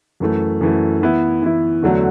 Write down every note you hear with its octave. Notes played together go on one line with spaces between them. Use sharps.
F#2 E3 A3
F#2 E3 A3
E3 B3 E4
E3 B3 E4
E2 D3 F#3 A3